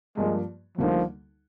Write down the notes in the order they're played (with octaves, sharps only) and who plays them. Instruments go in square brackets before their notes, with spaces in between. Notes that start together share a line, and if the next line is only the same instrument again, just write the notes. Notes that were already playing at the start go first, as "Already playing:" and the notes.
[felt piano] G2 F3 A#3 [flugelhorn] G#3
[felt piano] D2 D3 G3 A#3 D#4 [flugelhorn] F3